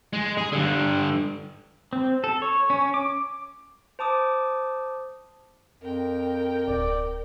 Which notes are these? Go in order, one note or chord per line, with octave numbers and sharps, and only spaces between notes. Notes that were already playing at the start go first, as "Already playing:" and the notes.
G#3
G#4
G2 D3
C4
A4
C#5
C#4
D6
C5 A5 D6 D#6
F2 A#4 G5
D1 D5